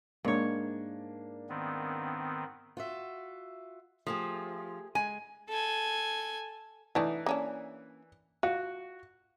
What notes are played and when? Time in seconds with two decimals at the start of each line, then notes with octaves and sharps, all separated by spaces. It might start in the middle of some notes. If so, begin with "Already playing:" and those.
0.25 G#2 A#3 D4 C#5
1.49 D#3 B3 C4
2.77 F4 F#4 E5
4.07 F3 A3 G4 G#4
4.95 G#3 G#5
5.49 A4 G#5
6.95 E3 A3 D4 D#4
7.26 A#3 C#4 D4
8.43 F4 F#4